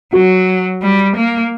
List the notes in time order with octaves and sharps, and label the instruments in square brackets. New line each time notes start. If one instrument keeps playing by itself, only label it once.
[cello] F#3 [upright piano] F#4
[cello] G3
A#3